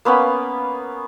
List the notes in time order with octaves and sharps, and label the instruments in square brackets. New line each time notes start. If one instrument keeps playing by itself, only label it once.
[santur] A#3 B3 C#4 B5